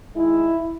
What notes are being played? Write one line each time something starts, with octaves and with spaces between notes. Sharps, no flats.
D#3 G#3 E4